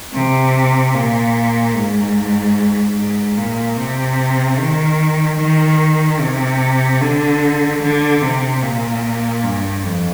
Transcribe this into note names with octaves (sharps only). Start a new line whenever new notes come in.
C3
A#2
G#2
G#2
A#2
C3
D#3
D#3
C3
D3
D3
C3
A#2
G2
F2